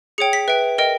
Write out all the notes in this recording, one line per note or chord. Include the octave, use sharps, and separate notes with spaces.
G#4 C#5 G5 C#7
B6
B4 E5 G5
A#4 D#5 G5